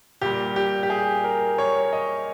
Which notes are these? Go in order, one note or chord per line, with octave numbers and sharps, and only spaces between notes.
A#2 G3 G4
G4
G4
G#4
A#4
C#5
D#5